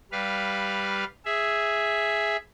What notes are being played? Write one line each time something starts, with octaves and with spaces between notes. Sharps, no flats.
G3 B4 F5
G#4 E5